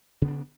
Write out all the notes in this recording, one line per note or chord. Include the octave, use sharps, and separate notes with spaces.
C#3 B3 D4